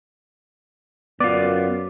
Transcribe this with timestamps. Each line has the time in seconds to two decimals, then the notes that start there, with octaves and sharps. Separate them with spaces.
1.20 F#2 B3 F4 D5